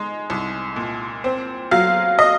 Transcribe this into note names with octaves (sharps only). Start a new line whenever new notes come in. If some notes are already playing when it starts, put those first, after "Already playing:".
Already playing: G#3 D#4
C2
A#2
C4
F#3 F5
D#5